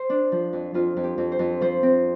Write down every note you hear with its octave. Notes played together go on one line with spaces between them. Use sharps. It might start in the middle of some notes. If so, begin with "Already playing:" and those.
Already playing: C5
D4
F3
F2
F2 F4
F2
G4
F2
C5
F2
F3 C5
C4